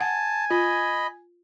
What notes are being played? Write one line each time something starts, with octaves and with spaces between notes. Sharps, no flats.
F#5 G#5 A5
F4 D#5 B5